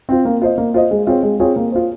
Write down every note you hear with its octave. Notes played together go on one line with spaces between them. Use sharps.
C4 F4
A#3
F4 C5 D#5
A#3
F4 C5 D#5
G#3
C4 F4 G#4 C#5
G#3
C4 F4 G#4 C#5
A#3
F4 C5